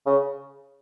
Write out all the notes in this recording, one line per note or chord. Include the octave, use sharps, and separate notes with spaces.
C#3